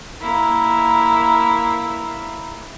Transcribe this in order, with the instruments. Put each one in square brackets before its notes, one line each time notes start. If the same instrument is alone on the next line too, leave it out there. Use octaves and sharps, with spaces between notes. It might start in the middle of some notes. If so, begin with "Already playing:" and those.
[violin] A#3 E4